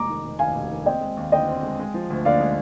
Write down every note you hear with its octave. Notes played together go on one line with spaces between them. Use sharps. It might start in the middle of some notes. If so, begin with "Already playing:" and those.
Already playing: F1 G#3 A#5 D6
D#3
F1
D#2 F5 G#5
F1
D#3
C4 D#5 G5
G#3
D#2
D3 D#5 G5
C4
G#3
G#3
F3
D2
D3 D5 F5
G#3